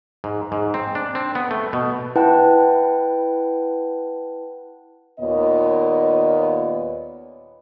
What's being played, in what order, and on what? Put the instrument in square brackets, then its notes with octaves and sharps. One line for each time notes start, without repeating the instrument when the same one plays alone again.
[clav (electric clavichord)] G#2
G#2
C4
D4
C4
B3
A3
B2
[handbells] E4 B4 F#5 G5 A5
[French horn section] D#2 A#2 B3 C#5 D#5